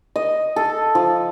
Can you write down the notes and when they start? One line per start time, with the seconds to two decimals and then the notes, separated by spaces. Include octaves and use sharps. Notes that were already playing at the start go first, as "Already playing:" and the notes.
0.16 D#5
0.56 A4
0.95 F3